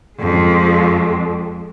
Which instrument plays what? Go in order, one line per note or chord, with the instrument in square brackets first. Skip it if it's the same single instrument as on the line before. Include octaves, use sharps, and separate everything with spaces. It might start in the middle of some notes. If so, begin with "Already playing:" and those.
[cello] F2 G#3